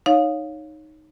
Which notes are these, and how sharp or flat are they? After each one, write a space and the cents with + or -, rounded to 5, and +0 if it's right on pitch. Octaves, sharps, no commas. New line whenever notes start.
D#4 +0 C#5 +0 F5 +15